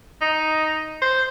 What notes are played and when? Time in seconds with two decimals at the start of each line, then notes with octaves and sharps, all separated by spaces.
0.21 D#4
1.02 C5